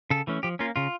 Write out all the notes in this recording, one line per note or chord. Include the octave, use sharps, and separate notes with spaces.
C#3 A4
E3 A3 C#4
F3 G4
A#3 C#4 F4
C#3 F4